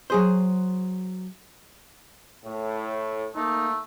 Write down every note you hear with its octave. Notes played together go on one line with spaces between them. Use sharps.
F#3 G#4 C5
A2
A3 A#3 D#4